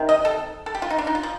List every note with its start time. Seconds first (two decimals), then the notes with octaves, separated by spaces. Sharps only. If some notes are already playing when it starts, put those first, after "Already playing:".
Already playing: C3 D#3
0.09 D#5
0.25 A4
0.66 A4
0.75 G4
0.82 F4
0.90 D#4
0.99 D4
1.07 D#4
1.15 F4
1.23 F3